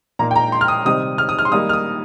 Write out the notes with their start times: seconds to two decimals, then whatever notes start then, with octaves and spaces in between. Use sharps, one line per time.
0.19 A#2 A#3 D#4 A#5
0.31 G5
0.36 A#5
0.52 C6
0.61 F6
0.68 D#6
0.85 C3 D#3 G3 C4 D#4 D#6
1.18 F6
1.29 D#6
1.39 F6
1.45 C6
1.52 D#3 G3 A#3 D#4 D#6
1.69 F6
1.73 D#6